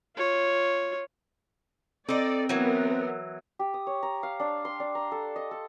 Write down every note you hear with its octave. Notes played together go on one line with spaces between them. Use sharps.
F4 C#5
C4 D#4 A4 D5
E3 F#3 B3 A#4
G4
D#6
C#5
A#5
F5
D4
C6
D4
A#5
A4
D#5
A4